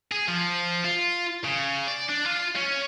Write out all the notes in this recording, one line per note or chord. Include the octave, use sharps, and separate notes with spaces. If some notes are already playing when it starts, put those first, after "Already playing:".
G#4
F3
F4
C#3
D5
D4
F4
C#4